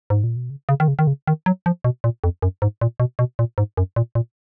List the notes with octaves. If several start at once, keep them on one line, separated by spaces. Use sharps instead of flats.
G#2
A#2
B2
C#3
C#3
D#3
C#3
D#3
C#3
D#3
F#3
F3
B2
A#2
F2
F#2
G#2
A#2
B2
B2
A#2
G#2
F#2
A#2
A#2